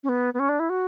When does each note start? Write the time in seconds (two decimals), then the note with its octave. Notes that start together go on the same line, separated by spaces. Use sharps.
0.03 C#4
0.09 B3
0.34 B3
0.39 C#4
0.49 D4
0.59 E4
0.69 F#4